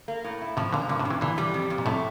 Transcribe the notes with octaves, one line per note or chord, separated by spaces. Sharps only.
A#3
A2
E4
A2 C3 F3
A#2 D3 A#3
G2 A#2 D3
A2 C3
G2
C3 E3
A#2 D3 E3
G3
F2
F2
A#2
A2 C3 A3